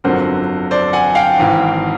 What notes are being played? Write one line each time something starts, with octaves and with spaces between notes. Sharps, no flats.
G1 F2 D3 F#3 A#4 C5
C5 D5
F#5 G#5
F5 G5
G#1 G#2 E3